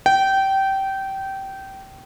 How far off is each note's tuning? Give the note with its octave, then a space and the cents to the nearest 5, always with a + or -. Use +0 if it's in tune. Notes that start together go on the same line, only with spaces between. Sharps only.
G5 -20